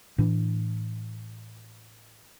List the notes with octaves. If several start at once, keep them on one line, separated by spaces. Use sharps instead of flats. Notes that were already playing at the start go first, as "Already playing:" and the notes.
A2 E3 D4